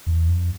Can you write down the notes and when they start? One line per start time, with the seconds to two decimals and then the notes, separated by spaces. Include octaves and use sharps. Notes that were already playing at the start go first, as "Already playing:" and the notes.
0.07 E2
0.28 F2